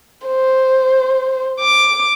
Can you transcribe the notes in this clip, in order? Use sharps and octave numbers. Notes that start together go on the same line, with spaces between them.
C5
D6